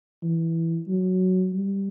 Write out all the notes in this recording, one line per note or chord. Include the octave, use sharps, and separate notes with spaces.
E3
F#3
G3